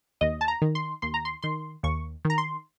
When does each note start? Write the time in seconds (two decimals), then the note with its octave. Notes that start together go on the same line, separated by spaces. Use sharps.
0.21 D#2 D#5
0.41 A5
0.48 A#5
0.62 D#3
0.75 C6
1.02 D#2 C6
1.14 A#5
1.25 C6
1.42 D#3 C6
1.83 D#2 C#6
2.25 D#3
2.30 A#5
2.38 C6